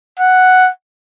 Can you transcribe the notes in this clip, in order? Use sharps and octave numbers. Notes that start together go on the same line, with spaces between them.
F#5